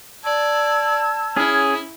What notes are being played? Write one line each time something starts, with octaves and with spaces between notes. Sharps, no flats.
D5 A5 E6 G#6
C#4 E4 G#4